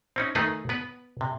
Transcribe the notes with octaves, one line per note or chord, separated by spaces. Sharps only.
C4 C#4 D#4
D#3 A3 D#4 G#4 B4
B3 B4
C3